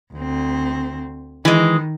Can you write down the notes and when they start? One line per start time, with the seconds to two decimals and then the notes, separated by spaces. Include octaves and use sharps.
0.14 D2 C4
1.45 D#3 E3 G#3